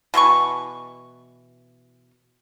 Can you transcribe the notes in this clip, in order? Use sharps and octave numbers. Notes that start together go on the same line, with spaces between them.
B2 E3 C6 C#6